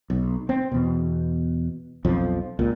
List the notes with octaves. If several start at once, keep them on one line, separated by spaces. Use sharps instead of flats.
B1
C4
E2 B2
B1 F2 F3
C#2 A#2